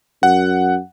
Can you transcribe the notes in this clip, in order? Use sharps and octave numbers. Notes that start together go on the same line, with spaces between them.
F#2 F#5